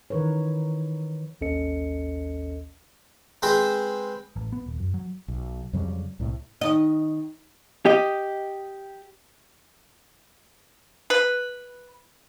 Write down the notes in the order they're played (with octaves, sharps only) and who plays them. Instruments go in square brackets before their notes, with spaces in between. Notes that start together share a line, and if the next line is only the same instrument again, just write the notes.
[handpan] D#3 E3 A#4 B4 C#5
[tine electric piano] A1 D#2 C#4 A4 D#5 C#7
[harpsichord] G#3 C4 G#4 B4 C5
[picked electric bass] A1
B3
D#1
F#2
F#3
[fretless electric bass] B1
F2 C#3 F#3 G3
C2 A2
[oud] D#3 D#5
[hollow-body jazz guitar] G4 D#5
[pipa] B4